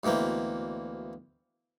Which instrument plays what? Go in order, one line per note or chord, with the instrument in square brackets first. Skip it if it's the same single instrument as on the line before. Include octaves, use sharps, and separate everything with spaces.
[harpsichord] D2 B2 E3 A#3 C4